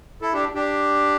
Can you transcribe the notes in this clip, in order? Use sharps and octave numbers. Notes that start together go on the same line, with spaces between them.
E4 A4
D4 G4
D4 G4